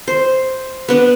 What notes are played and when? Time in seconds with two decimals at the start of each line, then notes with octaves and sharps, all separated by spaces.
0.08 C5
0.88 B3 D4